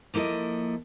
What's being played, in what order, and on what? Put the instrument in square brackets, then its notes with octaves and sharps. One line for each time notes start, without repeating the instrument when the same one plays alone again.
[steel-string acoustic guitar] F3 A#3 E4 A4 D#5